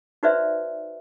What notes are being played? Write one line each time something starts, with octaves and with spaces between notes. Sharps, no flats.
D#4 F#4 B4 C5 D5 E5